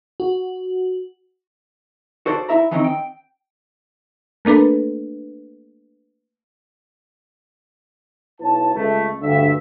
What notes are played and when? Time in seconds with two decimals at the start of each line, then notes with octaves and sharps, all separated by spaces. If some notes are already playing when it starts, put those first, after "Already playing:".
0.20 F#4
2.26 F#4 A4 C5 D5
2.49 E4 E5 A#5
2.71 D#3 E3 C4 C#4 D#4
2.84 G5
4.45 A3 A#3 D4 A4 B4
8.40 B1 E4 B4 C#5 A5
8.75 C#2 A3
9.22 D2 G2 E5